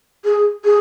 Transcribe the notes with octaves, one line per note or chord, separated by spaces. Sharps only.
G#4
G#4